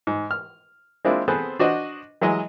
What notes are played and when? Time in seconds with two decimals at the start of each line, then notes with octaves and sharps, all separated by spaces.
0.07 G#2
0.31 F6
1.05 G#3 A#3 C4 D4 E4 F4
1.28 B3 C4 G#4 A4 B4 C5
1.59 D4 F#4 C5 D#5
2.22 E3 F#3 G#3 D#5